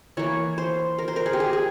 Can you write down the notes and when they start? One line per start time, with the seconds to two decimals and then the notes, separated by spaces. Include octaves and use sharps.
0.17 E3 A#3 C#5
0.58 C5
0.99 A#4
1.08 C5
1.16 A#4
1.26 G#4
1.33 G4
1.40 G#4
1.53 G#4